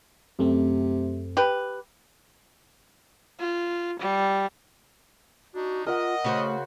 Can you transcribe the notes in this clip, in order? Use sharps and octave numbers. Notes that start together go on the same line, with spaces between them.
F#2 C3 A3 C4
G4 B4
F4
G3
D4 D#4 F#4
F4 A#4 D#5 E5 F#5
C#3 A3 F#4 C5